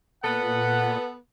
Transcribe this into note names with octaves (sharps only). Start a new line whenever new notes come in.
A#2 B3 A4 F#5